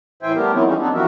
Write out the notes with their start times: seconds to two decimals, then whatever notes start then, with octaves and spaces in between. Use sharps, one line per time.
0.23 A2 E3 C5 E5 G5 G#5
0.35 G3 A3 B3 G4 A#4
0.52 D#3 E3 F#3 C4 D#4 E4
0.65 E3 F3 G3 G#3 C#4 D#4
0.78 B3 C4 D4 D#4
0.94 E3 F3 G3 F#4 A#4 E5